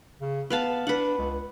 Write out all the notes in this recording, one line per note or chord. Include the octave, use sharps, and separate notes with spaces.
C#3
B3 B4 F5 A5
D4 B4 F#5
C#2